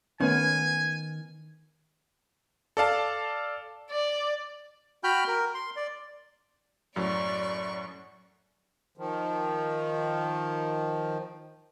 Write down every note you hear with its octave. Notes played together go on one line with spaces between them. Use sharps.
D#3 A3 B3 C#4 G#5
A4 D5 F5 A5
D5
F#4 G5 B5 F6 G6
A#4
C6
D5
F#2 A2 F#3 D5 C#6
D#3 F3